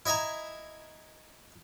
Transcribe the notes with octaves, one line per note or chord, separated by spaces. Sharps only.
E4 D#5 E5 G#5 A#5